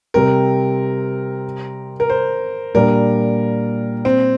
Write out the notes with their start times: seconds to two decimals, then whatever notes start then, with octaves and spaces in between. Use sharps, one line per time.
0.14 C3 G3 C4 A#4
2.00 A#4
2.09 C5
2.75 A#2 G3 D4 A#4
4.05 C4